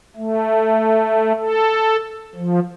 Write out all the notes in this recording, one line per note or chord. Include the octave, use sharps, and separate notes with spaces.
A3
A4
F3